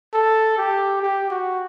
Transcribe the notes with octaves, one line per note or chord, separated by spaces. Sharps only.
A4
G4
G4
F#4